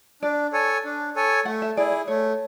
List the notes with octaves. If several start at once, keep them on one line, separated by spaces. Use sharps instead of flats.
D4 D5
A4 C#5 G#5
D4
A4 C#5 G#5
A3 F#5
E5
E4 G#4 D5
D5
A3 C#5